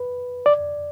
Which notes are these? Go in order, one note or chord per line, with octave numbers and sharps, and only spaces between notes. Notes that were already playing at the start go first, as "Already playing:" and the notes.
Already playing: B4
D5